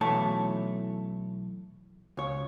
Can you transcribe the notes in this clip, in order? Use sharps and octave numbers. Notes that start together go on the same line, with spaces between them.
B1 E3 A3 E4 C#5 A5
C#2 C#5